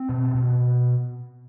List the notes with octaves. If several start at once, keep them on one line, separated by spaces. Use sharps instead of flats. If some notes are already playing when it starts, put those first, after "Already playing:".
Already playing: C4
B2
B2